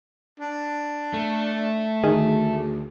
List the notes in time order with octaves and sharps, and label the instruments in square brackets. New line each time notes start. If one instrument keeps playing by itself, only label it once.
[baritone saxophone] D4
[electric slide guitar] A3
[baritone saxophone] D2 [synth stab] D#3 G#4